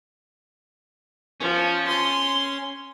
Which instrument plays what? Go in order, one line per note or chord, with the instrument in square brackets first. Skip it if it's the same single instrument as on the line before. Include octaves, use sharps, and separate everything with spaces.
[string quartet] F3 [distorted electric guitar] C#4
[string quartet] C6